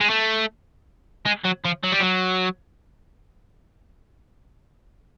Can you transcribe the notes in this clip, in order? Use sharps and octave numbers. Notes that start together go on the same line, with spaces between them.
G#3
A3
G#3
F#3
F3
F#3
G3
F#3